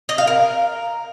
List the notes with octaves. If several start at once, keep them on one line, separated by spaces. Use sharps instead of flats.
D#5
F5
A#4